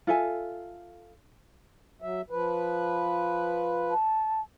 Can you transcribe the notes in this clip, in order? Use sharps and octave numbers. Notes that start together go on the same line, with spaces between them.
F4 A4 E5 G#5
F#3 E5
F3 B4
A5